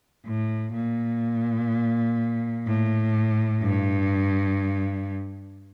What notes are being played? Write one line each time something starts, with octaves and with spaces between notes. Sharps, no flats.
A2
A#2
A2
G2